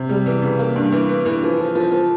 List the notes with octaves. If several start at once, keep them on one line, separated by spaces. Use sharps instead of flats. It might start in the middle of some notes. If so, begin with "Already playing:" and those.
Already playing: C3
G3
E3
C#3
A#3
G2
E3
E3
E3
F3
F3
F3
F3